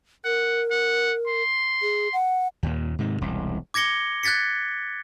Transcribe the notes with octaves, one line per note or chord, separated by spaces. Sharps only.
A#4 F#5
F#5
C6
G#4
F#5
D#2 A#2
G#2 C3 D#3
E1 C2
D6 G#6 A#6 C#7 G7
F#6 G#6 A6 B6 C#7